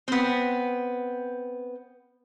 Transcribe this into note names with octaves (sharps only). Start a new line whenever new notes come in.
B3 C4